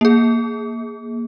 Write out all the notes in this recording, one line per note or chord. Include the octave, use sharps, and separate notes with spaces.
A#3 G#4